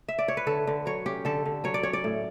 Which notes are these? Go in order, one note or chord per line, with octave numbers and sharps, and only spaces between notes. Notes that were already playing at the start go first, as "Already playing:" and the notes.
E5
D5
C#5
B4
D3 A4
D3
F#3 C#5
C#4 G4
D3 A4
D3
F#3 C#5
D5
C#4 C#5
D5
A2